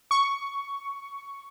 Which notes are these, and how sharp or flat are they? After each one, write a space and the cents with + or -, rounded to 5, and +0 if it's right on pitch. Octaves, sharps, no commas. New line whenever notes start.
C#6 +10